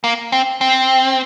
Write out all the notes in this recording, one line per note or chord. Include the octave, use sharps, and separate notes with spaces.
A#3
C4
C4